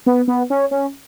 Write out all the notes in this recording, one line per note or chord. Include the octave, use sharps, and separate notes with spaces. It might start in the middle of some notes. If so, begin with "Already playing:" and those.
B3
B3
C#4
C#4